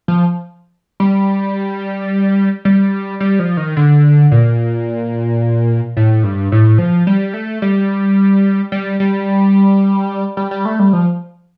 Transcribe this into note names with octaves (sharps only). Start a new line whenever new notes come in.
F3
G3
G3
G3
F3
D#3
D3
A#2
A2
G2
A2
F3
G3
A3
G3
G3
G3
G3
G3
A3
G3
F3